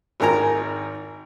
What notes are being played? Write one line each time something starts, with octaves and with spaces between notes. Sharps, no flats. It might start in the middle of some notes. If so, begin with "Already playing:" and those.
G#1 D#3 A#4 G#5 A#5